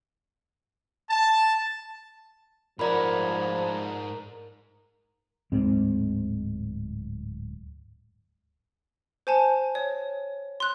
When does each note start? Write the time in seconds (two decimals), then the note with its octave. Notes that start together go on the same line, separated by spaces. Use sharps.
1.09 A5
2.79 G#2 F3 A#4 D5 F#5 B5
5.52 D1 G#2 G#3 C4
9.27 C5 G#5 A5
9.75 C#5
10.60 C6 F#6